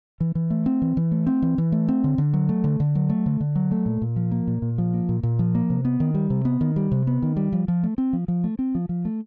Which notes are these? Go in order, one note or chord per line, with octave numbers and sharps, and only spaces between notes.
E3
E3
A3
C4
E3
E3
A3
C4
E3
E3
A3
C4
D3
D3
F#3
A3
D3
D3
F#3
A3
D3
D3
F#3
A3
A#2
A#2
F3
A#3
A#2
A#2
F3
A#3
A#2
A#2
F3
A#3
C3
B3
D#3
G3
C3
B3
D#3
G3
C3
B3
D#3
G3
F3
F3
A3
C4
F3
F3
A3
C4
F3
F3
A3